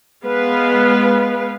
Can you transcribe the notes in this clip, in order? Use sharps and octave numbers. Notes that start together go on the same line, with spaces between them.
G#3 B3 B4 F5